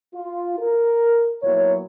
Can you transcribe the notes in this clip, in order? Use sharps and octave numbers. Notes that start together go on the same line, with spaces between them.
F4
A#4
A#2 F#3 B3 E4 C#5